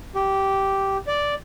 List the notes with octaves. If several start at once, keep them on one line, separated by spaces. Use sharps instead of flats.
G4
D5